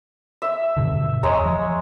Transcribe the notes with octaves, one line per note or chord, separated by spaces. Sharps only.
E5
G2 B2 D3
E2 G#3 C#5 A#5
F3